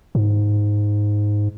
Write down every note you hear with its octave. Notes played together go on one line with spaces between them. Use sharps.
G#2